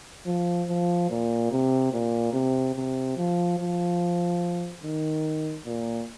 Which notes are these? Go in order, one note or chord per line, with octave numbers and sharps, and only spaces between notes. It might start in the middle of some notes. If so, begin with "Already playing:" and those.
F3
F3
A#2
C3
A#2
C3
C3
F3
F3
D#3
A#2